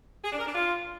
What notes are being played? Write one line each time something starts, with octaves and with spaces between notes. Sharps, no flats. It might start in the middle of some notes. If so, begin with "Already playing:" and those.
G#4
D4
A#4
D4
F4